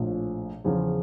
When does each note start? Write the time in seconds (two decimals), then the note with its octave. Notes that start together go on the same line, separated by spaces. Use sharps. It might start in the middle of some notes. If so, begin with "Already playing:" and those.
Already playing: A#1 A2 F3
0.65 E2 C#3 F3 C#4 F4